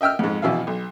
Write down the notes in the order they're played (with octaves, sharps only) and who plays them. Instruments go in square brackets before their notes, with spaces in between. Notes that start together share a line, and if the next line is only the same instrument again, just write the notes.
[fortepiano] D#5 E5 G5 E6 F6
F2 G#2
A#1 B2 E3 E5 F5
B1